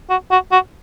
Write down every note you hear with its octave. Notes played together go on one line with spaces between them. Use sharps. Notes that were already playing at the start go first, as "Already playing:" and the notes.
F#4
F#4
F#4